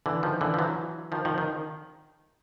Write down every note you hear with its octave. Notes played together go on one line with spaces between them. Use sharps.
D3 E3
D#3 F3
D3 E3
F3
E3 F#3
D#3 F3
D#3 F3
D#3